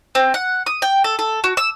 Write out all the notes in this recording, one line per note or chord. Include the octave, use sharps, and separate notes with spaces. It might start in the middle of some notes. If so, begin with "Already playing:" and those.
C4
F#5
D#6
G5
A4
A4
F#4
E6